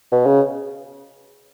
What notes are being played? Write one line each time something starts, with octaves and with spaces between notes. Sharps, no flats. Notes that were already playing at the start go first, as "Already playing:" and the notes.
B2
C#3